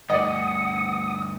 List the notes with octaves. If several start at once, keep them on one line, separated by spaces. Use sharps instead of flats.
D2 G2 D5 D#5 F#5 D#6